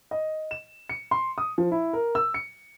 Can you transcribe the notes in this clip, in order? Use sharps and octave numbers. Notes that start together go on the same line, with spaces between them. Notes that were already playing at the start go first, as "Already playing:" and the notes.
D#5
E7
C#7
C6
D#6
F3
E4
A#4
E6
C#7